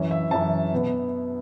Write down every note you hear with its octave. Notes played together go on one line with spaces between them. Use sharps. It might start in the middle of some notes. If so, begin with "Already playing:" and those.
Already playing: F#2 E3 C#4
E5
F#2 E3 C#4 A5
B2 B3